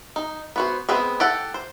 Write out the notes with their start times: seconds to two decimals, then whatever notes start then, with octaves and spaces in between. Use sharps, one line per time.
0.16 D#4
0.56 B3 F#4 C5
0.89 G#3 B3 C4 G4 G#4
1.20 G4 A4 F#5
1.54 C5